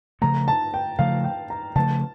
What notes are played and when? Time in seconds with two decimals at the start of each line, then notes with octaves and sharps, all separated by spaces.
0.22 C#3 F3 A3 A#5
0.48 A5
0.74 G5
0.99 C#3 F3 A3 F5
1.25 G5
1.50 A#5
1.75 C#3 F3 A3 A5